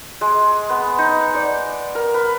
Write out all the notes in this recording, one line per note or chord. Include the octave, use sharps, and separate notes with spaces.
G#3
B3
D#4
D5
A#4
B4